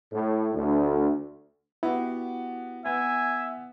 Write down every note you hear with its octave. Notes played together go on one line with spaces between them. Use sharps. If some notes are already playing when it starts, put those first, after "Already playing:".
A2
D2
B3 E4 F#4 G4
B3 E5 G#5